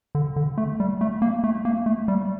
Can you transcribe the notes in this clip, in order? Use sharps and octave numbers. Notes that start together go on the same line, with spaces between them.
D3
D3
A3
G3
A3
A#3
A3
A#3
A3
G3